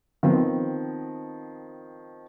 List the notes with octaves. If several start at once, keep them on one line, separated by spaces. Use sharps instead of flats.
D#3 F3 B3 C4